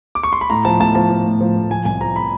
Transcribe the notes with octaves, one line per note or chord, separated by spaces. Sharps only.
D6
C#6
C6
B5
A2 A#5
F3 A5
A2 A5
F3 A5
F3
A2
F3
A2
F3 G#5
C2 G#5
F3 A#5
B5